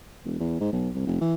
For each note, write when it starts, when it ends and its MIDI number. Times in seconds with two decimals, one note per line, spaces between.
0.24 0.37 28
0.40 0.57 40
0.60 0.69 44
0.72 0.89 35
0.95 1.04 36
1.07 1.18 29
1.21 1.35 52